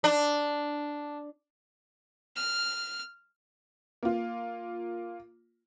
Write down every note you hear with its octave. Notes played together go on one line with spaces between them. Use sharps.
D4
F6
A#3 F4